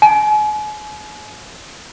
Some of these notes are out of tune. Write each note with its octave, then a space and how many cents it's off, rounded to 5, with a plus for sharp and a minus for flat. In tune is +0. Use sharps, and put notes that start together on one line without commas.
G#5 +40